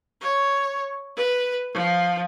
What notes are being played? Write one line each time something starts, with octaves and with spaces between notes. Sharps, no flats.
C#5
B4
F3